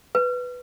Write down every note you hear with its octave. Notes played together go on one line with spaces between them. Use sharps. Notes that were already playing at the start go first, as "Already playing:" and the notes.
B4